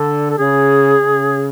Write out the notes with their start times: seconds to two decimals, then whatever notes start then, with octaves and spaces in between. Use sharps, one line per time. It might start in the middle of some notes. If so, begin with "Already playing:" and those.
Already playing: D3 A4
0.30 A4
0.38 C#3 G#4
1.01 C#3